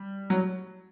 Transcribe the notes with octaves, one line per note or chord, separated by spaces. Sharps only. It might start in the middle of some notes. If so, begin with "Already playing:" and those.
Already playing: G3
F#3